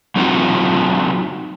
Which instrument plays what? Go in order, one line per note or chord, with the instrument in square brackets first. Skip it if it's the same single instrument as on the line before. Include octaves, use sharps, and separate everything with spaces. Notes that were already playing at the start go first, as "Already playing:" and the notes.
[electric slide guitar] F#3 C4 D#4 F4 F#4